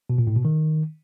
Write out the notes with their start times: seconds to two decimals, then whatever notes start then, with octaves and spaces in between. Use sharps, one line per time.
0.10 B2
0.18 A#2
0.27 A2
0.36 B2
0.45 D#3